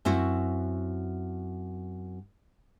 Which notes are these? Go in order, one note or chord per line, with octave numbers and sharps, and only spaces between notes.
F#2 C4 E4 F#4